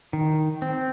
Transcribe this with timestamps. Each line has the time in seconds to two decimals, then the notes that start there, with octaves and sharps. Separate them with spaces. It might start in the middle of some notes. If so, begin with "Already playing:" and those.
0.13 D#3
0.62 C4